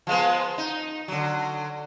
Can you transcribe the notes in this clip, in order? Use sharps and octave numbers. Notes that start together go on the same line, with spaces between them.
F3 G#3 B3
D#4
D3 F#3